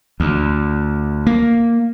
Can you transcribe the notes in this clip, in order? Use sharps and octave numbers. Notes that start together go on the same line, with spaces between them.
D2
A#3